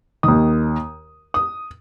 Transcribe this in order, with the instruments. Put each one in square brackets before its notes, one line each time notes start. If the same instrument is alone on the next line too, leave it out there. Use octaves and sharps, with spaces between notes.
[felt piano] D#2 D#3 D#6
D#6